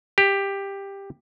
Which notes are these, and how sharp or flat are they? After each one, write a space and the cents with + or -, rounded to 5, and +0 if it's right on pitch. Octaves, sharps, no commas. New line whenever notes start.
G4 +10